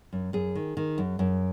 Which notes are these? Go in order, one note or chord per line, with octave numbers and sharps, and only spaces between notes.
F#2
F#2 G#4
D#3
D#3
F#2
F#2